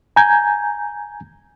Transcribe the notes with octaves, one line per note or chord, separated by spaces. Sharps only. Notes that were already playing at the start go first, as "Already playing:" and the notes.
G#5 A#5 G6 G#6